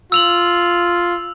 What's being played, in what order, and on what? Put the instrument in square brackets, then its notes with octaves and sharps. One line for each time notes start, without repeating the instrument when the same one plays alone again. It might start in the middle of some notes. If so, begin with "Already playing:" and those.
[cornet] F4 [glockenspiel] E6 F7 F#7